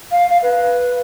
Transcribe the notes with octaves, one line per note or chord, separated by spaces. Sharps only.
F5
F5
B4